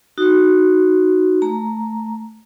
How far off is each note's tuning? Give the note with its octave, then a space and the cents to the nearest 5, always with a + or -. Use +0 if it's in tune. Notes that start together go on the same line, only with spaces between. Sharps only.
D#4 -5 F#4 +0
A3 +0 A#5 +0